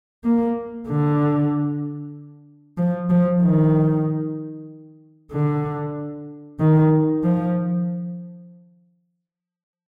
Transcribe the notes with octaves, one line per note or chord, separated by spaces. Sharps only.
A#3
D3
F3
F3
D#3
D3
D#3
F3